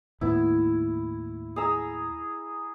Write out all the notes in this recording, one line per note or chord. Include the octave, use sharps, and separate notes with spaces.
D#2 A2 B3 E4
G#4 A#5 E6